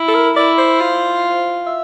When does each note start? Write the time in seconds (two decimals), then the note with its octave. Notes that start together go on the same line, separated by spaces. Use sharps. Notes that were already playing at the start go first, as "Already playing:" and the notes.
Already playing: E4
0.08 A4
0.14 A#4
0.36 E4 D5
0.58 C5
0.80 F4
1.66 E5